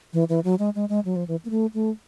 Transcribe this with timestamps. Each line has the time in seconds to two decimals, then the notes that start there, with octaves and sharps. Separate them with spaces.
0.13 E3
0.29 E3
0.44 F#3
0.59 G#3
0.75 G#3
0.89 G#3
1.05 F#3
1.16 F3
1.28 E3
1.45 A#3
1.50 A3
1.74 A3